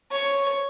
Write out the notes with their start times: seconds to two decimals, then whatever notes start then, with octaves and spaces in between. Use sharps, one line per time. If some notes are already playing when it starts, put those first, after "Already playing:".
0.12 C#5